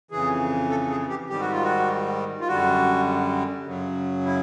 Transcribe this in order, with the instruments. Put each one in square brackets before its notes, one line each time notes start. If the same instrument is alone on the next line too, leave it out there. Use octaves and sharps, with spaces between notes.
[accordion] F2 C#3 E3 G#4
A4
G#4
G4
G#2 D#3 G3 G4
F#4
F4
F#4
F4
F#2 D3 G3 F#4
F#2 C#3 F#3
E4